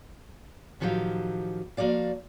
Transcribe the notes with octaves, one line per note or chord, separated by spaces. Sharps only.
A2 D#3 F3 F#3 G4 F5
F3 A#3 F#4 D5 F5